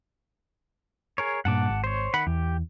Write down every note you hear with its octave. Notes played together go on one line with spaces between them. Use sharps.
G#4 A#4 C#5
G2 A#2 F#5 A5 D6
G#1
C5 C#5
D#3 F#5 B5
E2 G4